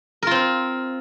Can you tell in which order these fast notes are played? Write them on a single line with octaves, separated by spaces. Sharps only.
A#4 F4 C4